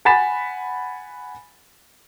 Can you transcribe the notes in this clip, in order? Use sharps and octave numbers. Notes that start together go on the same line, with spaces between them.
F#5 G#5 B5 A6 B6 E7